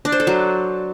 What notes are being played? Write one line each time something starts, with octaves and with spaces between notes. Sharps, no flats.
D4
C5
A4
F#3